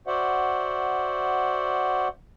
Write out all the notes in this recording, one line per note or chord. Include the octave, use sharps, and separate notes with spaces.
F#4 C5 D5 E5 F#5